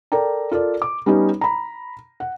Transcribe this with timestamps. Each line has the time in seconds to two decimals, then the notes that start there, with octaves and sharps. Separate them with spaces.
0.12 A4 A#4 D5 G5 A#5
0.51 F4 A4 A#4 D5
0.82 D6
1.06 G3 B3 C#4 D#4 G4
1.41 A#5 B5
2.20 F#5